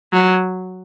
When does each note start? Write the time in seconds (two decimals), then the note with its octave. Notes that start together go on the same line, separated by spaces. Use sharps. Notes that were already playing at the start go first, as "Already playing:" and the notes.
0.13 F#3